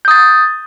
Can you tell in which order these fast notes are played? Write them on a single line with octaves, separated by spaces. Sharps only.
G6 D#6 A6